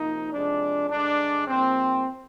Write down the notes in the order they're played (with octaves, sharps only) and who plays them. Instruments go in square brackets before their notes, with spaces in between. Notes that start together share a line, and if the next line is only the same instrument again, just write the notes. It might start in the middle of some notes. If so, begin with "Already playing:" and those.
Already playing: [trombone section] C3 F3 A#3 D#4
C3 F3 G#3 D4
G2 D3 G#3 D4
G#2 F3 A#3 C4